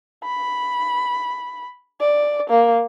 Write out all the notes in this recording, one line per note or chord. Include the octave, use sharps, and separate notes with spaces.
B5
D5
A#3